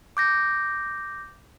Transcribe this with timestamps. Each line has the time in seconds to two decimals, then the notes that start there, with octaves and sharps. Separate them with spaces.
0.17 D6 G6 A#6